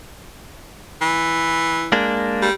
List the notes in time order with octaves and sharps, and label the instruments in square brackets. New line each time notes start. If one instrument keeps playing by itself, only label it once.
[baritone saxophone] E3
[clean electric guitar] G#3 A#3 D4
[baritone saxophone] G3